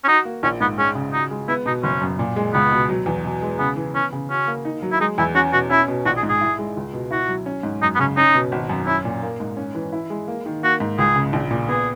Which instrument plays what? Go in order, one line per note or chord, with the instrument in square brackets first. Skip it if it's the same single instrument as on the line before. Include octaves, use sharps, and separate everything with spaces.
[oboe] C#4
[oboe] D#4 [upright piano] F#4
[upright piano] A#3
[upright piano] A#1 [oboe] C#4
[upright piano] G#2 [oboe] B3
[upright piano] G#3 [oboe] C#4
[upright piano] C#3
[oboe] D#4 [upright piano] F#4
[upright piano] G#3
[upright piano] B3 [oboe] E4
[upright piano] B2 [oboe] D#4
[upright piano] F#1 [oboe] C#4
[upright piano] F#2
A#2
G#3
[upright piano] C#2 [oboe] B3
[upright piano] B2
F#3
E2
B2
G#3
[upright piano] C#3 [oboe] B3
[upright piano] E3
[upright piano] B3 [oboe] C#4
[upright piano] C#3
[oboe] C#4 [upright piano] F#4
[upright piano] A#3
D#4
F#3
[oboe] E4
[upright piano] G#3 [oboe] D#4
[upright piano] E2 [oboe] E4
[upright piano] C#4 [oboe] F#4
[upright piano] B2 [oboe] F#4
[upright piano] C#4 [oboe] E4
[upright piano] B2
[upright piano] A#1 [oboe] F#4
[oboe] G#4
[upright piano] G#2
[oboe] G#4
[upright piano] E4
G#3
C#2
B2
[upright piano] E4 [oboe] F#4
[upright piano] F#3
C#4
G#2
[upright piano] F#2 [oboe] D#4
[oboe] B3
[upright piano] C#3 [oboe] C#4
[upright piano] C#4 [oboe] D#4
[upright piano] B2
G#1
F#2
[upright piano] C#4 [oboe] E4
[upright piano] A#2
A#3
G#2
C#4
E3
E4
G#3
A#3
D#3
[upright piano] A#3 [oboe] F#4
[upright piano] G#2
[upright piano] C#2 [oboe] G#4
[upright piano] C#3
A#1
A#2
[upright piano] B3 [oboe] G#4